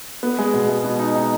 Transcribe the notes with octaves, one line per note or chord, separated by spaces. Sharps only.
B3
G#3
B2
G#3
B2
D#4
D#4